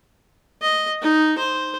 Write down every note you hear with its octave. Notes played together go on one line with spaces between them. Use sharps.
D#5
D#4
C5